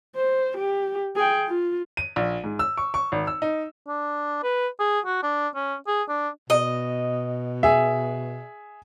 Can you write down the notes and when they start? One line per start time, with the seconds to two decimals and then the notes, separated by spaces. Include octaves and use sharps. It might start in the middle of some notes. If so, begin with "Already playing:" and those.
0.16 C5
0.58 G4
1.16 G#4 G5
1.47 F4
1.97 D#7
2.16 A#1
2.44 G#2
2.59 E6
2.77 C#6
2.94 C#6
3.12 G#1
3.27 E6
3.42 D#4
3.88 D4
4.43 B4
4.79 G#4
5.05 F#4
5.23 D4
5.55 C#4
5.87 G#4
6.08 D4
6.50 B2 D#5
7.63 G#4 E5